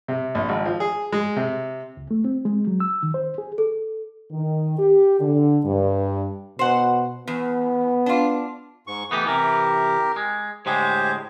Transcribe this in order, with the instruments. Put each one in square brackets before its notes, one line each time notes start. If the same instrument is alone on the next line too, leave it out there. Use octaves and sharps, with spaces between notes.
[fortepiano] C3
A#1
G#1
F3
G#4
G#3
C3
[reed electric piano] C#2
A3
C4
G#3
F#3
E6
D#3
C5
G#4
[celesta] A4
[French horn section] D#3
G4
D3
G2
[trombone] B2 [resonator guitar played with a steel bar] C5 F#5
[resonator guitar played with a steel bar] E2 [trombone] B3
[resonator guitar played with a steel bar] D4 F4
[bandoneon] G#2 C#6
[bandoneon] E3 A3 [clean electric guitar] B3 D#4 G4
[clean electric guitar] C3 E3 [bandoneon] G4 A#4
[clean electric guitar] G#3
[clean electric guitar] A2 D3 G#3 [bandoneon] G4 C5